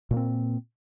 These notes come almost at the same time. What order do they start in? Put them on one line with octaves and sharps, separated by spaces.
A#2 A#3 C4